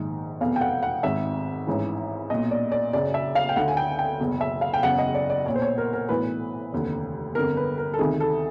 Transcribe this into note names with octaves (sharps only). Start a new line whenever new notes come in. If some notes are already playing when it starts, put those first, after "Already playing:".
Already playing: A#1 G#2 D#3
F1 E2 B2 F5
G5
F#5
F#5
G#1 G#2 D#3 E5
A1 G#2 E3
B1 A#2 D#5
D5
D5
F#1 F#2 C#3 D5
E5
F5
G5
D2 D3 F#5
G#5
G5
G5
F#1 E2 B2
E5
F5
G5
F#1 E2 C#3 F#5
D#5
D5
D5
B1 A#2 C#5
C5
C#5
A#4
A#4
B1 A2 E3 B4
F1 D#2 D3
G1 F2 D3 A#4
B4
A#4
A4
D2 C3 D#3 G#4
A4